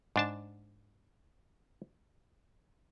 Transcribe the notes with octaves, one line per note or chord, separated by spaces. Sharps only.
G#2 D4 A5